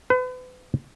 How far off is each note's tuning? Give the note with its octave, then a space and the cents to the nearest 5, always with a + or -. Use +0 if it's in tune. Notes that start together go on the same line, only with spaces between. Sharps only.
B4 +40